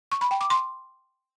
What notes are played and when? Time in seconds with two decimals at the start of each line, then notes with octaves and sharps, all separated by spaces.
0.11 C#6
0.21 B5
0.31 G5
0.41 D6
0.50 C6